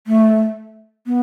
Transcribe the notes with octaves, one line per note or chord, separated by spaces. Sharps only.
A3
B3